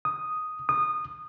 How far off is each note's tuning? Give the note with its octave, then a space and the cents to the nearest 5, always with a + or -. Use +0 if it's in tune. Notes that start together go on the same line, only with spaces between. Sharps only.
D#6 +0
D#6 -20